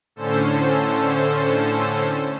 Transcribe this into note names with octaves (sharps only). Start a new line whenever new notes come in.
A2 D3 C#4 A4 C5 E6